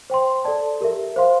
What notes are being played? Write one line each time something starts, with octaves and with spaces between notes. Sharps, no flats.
C5 G5 C6
A4 D5 A5
G4 A#4 E5
C5 F5 C6